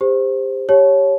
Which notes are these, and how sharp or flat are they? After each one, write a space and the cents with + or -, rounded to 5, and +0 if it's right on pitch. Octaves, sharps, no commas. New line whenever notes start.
G4 +30 C5 +0
G4 +0 C#5 +0 A5 -25